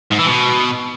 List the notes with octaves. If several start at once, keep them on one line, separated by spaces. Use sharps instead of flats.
G#2
E3
B2